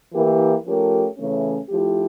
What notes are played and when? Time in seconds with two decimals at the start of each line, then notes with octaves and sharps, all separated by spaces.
0.14 E3 A#3 E4 G4 A#4
0.65 F3 A3 C#4 G4 A#4
1.18 C#3 E3 A3 C#4
1.69 F3 A3 E4 G4